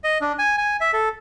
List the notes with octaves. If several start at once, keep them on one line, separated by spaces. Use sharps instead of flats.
D#5
D4
G#5
G#5
E5
A4